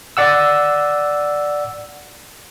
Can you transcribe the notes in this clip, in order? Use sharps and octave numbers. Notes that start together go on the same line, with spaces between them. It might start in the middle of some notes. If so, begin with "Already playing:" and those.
D5 F#5 E6